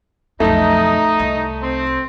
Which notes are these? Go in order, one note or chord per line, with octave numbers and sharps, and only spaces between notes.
B1 F2 A3 D#4
C2
C4